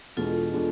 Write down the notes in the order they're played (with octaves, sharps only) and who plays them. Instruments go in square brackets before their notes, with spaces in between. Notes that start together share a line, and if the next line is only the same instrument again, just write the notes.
[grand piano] E2 B2 G#3 D4 [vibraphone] F4 A4
[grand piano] B2 G#3 D4